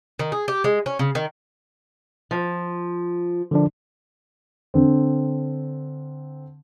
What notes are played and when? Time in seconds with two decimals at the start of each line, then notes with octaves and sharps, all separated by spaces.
0.19 D#3
0.32 G#4
0.48 G4
0.64 G#3
0.86 C#4
0.99 C#3
1.15 D#3
2.31 F3
3.51 D3 F3 D4
4.74 D3 C4